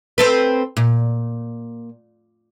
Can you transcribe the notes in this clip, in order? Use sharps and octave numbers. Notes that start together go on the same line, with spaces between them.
C4 A4 B4
A#2